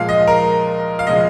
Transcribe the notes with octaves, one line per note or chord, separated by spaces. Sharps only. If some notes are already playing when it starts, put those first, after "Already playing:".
Already playing: A#2 F3 G#3 F5
D#5
A#4
F5
C#3 F3 G#3 D#5